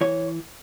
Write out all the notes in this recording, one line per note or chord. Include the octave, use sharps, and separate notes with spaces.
E3 C#5